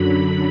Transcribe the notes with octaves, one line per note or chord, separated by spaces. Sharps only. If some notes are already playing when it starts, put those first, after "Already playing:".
Already playing: F#2 D3 F#3 B5